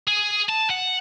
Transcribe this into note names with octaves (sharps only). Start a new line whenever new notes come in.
G#4
A5
F#5